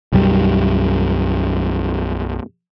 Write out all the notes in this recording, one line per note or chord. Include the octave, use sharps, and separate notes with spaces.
B1 F#2 G3